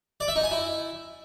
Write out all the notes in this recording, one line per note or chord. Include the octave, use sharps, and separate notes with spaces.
D5
E5
D#4
G#5
E4